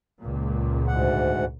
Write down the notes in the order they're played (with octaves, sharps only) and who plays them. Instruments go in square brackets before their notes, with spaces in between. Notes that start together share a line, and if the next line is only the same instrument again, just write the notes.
[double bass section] C#2 A#2
[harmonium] D2 G#2 F#5